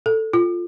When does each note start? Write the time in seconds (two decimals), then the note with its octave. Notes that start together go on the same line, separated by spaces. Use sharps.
0.06 A4
0.33 F4